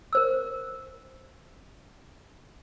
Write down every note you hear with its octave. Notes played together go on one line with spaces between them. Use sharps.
A#4 C5 E6